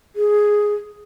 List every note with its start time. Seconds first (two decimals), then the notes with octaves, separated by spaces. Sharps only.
0.16 G#4